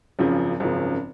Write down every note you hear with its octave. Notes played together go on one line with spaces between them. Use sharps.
G#1 F#2 C#3 F3
G#1 F#2 C#3 F3